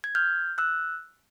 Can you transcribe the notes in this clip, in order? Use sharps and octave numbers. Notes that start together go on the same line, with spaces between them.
G#6
F6 G6
E6 F#6